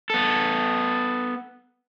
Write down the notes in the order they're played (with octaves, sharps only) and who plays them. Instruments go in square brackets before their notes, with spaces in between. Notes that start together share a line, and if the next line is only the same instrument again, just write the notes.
[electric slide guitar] B3 A4